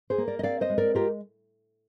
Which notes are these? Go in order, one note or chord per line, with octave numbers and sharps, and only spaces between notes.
G#4 C5
A#3
A#4 D5
D#5
C4 D5 F5
C5 D#5
G#3
A#4 D5
F4 G4 A#4